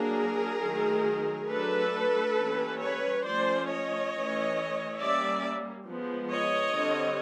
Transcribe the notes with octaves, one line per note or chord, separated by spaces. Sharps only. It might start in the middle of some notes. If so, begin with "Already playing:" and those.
Already playing: F#3 A#3 D4 G#4 A#4
D#3 F#3 A3
F#3 A3 D4 A4 B4
E3 G3 A#3 C#4
B4 C#5
F3 A3 C#4 C5 D5
C#5 D#5
E3 A3 C#4
G3 A#3 C#4 D5 E5
F3 G#3 B3
C#5 D#5
D3 G3 C4